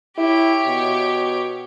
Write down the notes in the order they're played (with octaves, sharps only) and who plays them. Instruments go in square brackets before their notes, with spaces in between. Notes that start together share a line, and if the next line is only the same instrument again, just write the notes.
[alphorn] E4 [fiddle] G4 C#5
[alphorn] B2